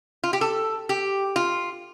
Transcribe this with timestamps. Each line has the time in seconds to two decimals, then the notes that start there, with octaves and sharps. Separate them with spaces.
0.24 F4
0.33 G4
0.41 A4
0.89 G4
1.36 F4